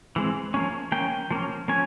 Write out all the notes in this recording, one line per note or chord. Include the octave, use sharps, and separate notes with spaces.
E3 G#3 C4
F3 A#3 C#4
F3 A#3 C#4 G5
F3 A#3 C#4
F3 A#3 C#4 G#5